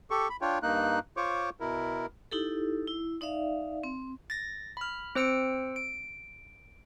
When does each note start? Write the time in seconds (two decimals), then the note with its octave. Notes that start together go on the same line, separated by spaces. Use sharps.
0.10 G4 A4 C#6
0.30 B5
0.41 D4 F4 C#5 G5
0.63 G2 A#3 D#4 F#6
1.17 F4 C5 C#5 C#6 D6
1.60 B2 E4 A#4
2.31 D#4 E4 G4 A4
2.87 E4
3.21 D#4 D5 E5 F5
3.84 C4
4.30 A6 A#6
4.77 B5 F6
5.15 C4 C5 E6 C#7 D7
5.76 D7